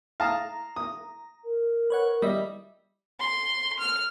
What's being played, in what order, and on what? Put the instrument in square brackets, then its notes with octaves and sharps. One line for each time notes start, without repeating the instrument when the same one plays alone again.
[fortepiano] F5 A5 D#6 [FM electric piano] A#5
[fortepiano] D#6
[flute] A#4
[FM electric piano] B4 C#5 F#5
[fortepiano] G3 [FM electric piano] D#5 E5
[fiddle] C6
F6